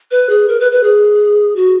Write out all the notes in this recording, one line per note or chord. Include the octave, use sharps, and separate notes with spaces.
B4
G#4
A#4
B4
B4
G#4
F#4